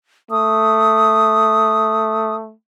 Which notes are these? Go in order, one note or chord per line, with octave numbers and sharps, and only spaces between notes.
A3 D#6